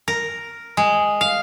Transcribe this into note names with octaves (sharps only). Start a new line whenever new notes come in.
A#4
G#3
F5